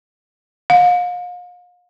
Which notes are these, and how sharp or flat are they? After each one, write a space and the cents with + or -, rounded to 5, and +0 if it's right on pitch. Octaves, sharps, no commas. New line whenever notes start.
F5 +40